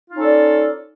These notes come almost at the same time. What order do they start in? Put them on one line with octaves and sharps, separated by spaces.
F4 D#4 C#4 A4 D5